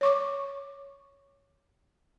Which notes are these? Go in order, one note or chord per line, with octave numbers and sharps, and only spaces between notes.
C#5 C#6 D6